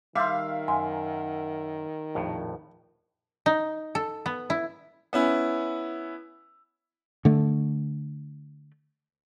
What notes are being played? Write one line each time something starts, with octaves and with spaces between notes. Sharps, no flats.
D#3 G3 E5 F5 C6 D6
F#2 G#5 C6
A#1 F2 A2
D#4
A4
B3
E4
B3 C#4 E4
D3 A3